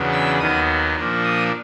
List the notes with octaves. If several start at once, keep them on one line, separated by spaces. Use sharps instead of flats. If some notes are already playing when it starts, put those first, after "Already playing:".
Already playing: E2 C#3 F#3 B3 D4
E6
D#2 D#3 F#3 B3 D#6
A#2 F3 A#3 D4
D#6